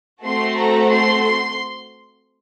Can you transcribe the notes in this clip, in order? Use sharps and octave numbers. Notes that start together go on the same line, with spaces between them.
A3 C4 F#4 A4 C6
A#5
C6
C6